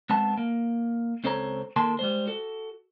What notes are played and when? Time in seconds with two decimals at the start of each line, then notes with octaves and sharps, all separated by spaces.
0.10 G#3 B3 C4 A5
0.37 A#3
1.24 C#2 C4 A4 C5 C#5 A#5
1.76 D#3 A#3 A4 A5 C6
1.99 G3 G#3 C5
2.27 F#4 A4